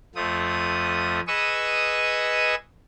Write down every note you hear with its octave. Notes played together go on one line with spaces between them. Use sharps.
F2 F3 A3 D#6
G#4 B4 D#5 C#6 D#6 E6